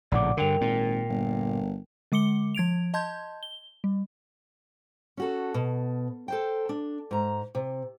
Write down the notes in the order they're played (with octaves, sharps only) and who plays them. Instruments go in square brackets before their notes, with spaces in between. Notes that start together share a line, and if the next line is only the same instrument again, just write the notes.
[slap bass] A#1 A2 C#3 [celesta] D5 F#5 D6
[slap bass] G2 D3 [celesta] A#4 G5 F7
[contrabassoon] G#1 [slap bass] A#2
[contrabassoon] G1
[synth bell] D3 G#3 D6 C#7 G7
F3 G#6 D7 F7
D#5 A5 C6 G6 G#6
G7
G3
[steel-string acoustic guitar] C#4 F#4 A4
B2
A4 C5 G5
D4
G#2 A#5
C3